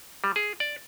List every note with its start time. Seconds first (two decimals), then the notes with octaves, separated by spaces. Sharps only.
0.24 G3
0.36 G#4
0.60 D5